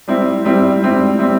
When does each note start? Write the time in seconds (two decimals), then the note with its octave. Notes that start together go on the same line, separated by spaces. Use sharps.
0.08 G3 C4 E4
0.45 G3 C4 E4
0.82 G3 C4 E4
1.19 G3 C4 E4